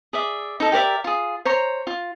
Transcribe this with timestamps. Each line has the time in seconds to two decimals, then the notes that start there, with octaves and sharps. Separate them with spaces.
0.13 G#4 D5 E5
0.60 D#4 A4
0.72 G4 A#4 D5 E5
1.04 F4 G#4
1.45 C5 C#5 A#5
1.87 F4